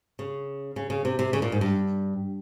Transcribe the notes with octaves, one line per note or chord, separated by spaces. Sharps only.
C#3
C#3
C#3
C3
C3
C#3
A#2
G#2
G2